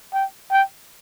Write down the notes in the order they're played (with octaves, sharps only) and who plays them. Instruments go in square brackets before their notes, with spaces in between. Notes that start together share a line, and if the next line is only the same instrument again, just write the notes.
[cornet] G5
G5